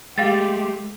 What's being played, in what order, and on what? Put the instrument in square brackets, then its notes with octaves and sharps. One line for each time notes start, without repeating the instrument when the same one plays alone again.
[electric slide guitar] G#3 A3 [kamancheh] G4 [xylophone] F5 G5 A6